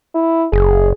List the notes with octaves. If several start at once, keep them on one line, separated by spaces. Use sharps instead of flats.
E4
F#1 G#4